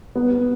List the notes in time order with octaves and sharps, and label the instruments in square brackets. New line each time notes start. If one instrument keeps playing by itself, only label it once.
[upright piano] B3